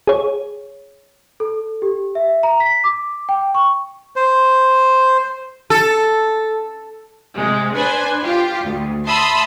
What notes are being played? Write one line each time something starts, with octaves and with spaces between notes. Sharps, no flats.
G#4 C#5
A4
G4
E5
A#5
B6
D6
G5
C#6
C5
A4
C3 G#3
D4 B4 C5 G#5
F4 G4
D2
E5 A5 B5 C6 D#6 E6